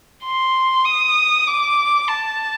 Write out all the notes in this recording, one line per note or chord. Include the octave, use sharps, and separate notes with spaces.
C6
D#6
D6
A5